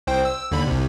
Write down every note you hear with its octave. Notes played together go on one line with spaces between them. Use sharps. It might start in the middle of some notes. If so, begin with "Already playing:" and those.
C2 C5 G5
E6
D#2 D3 B5
C2 C3